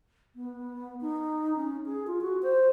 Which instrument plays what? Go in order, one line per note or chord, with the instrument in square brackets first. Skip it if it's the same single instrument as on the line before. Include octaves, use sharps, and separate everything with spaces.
[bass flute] B3
D#4
C#4
G#4
F4
F#4
C5